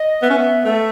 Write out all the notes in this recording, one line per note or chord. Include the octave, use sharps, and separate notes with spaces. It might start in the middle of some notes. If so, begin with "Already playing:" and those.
Already playing: D#5
B3 E5
C#4
B3
A3 E5